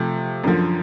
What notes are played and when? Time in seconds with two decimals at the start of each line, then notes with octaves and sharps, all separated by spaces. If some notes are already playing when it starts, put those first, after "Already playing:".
Already playing: C3 F3 A3
0.44 F#2 D3 F3